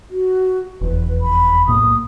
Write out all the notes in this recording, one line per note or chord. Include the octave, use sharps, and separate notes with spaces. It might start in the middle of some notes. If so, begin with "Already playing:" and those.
F#4
F1 E2 B4
B5
B1 A2 A#3 D#6